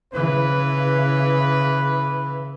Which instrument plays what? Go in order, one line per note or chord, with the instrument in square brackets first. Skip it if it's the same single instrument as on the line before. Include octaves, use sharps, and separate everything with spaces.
[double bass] C#3 E3 [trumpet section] B4